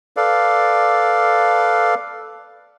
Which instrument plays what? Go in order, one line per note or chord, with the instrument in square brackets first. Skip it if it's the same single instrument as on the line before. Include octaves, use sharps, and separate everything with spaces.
[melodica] A4 B4 D5 F5